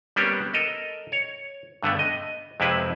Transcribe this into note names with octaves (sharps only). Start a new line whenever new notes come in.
G3 A#3 B3 C#4 D4 G4
A4 A#4 D#5
C#5
G2 D3 A3 B3
D#5
F2 C3 G#3 C4 E4 B4